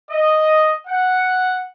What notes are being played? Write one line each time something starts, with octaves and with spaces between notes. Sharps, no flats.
D#5
F#5